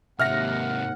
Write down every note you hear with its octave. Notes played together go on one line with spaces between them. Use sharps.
D#2 G#2 C3 E5 F#5 F6 A#6